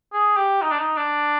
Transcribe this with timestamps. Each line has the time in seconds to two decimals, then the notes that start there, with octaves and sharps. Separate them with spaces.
0.13 G#4
0.37 G4
0.62 D#4
0.71 D4
0.79 D#4
0.97 D4